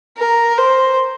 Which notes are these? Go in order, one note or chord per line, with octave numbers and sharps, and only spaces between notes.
A#4
C5